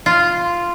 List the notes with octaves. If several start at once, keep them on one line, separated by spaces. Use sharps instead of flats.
F4